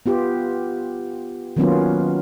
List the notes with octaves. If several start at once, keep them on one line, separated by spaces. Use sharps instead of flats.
B3 F4 G4
D#3 F#3 A#3 B3 C#4 F4